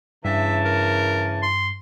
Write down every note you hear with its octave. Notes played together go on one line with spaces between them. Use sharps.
G2 C#3 E3 E5 A5
A#4
C6